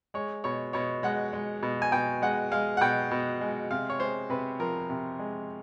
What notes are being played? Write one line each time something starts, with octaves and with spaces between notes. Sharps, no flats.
G#3 C#5
B2 C#5
B2 C#5
G#3 F#5
G#3
B2
G#5
B2 G5
G#3 F#5
G#3 F5
F#5
B2 G5
B2
G#3
C3 F5
C#5
G#3 C5
C3 B4
F3 A#4
C3
G#3